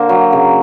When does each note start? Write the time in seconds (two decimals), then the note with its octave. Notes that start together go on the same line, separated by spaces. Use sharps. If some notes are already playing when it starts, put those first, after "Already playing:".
Already playing: D3 A#3 C5
0.09 F#3
0.32 C#3